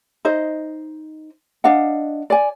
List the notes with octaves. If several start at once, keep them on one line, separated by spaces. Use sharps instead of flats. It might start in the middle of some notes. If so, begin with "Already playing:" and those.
D#4 C5 D#5
D4 D#5 F5 F#5
D5 G#5